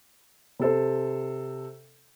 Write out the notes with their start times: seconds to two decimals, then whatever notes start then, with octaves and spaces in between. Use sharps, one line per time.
0.60 C3 A4 C5